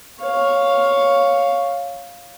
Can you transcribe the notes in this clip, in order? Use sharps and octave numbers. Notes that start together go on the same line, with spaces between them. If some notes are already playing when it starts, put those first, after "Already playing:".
C#5 F5